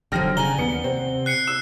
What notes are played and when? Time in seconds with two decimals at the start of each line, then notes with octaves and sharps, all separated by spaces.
0.12 D#1 D3 F3 F#3 G5 F6 A#6
0.37 C#3 D5 F#5 G#5 A#5 G7
0.58 D#2 B3 C#7
0.84 C3 C4
1.26 F#6 C7 C#7
1.47 E6 E7